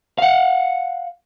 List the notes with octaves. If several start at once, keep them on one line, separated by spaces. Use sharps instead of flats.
F5 F#5